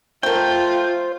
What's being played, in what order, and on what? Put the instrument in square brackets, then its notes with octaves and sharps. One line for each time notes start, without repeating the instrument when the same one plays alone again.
[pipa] A3 A#4 [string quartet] F4 [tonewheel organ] C5 [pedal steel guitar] G5